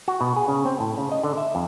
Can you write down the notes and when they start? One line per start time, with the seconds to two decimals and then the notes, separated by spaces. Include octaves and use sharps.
0.08 F#4
0.21 B2
0.36 G#4
0.48 C#3
0.65 C4
0.80 A2
0.98 C#3
1.12 D#5
1.23 D3
1.38 E5
1.55 F2